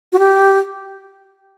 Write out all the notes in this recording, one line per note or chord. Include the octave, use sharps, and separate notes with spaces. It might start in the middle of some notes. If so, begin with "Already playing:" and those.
F#4
G4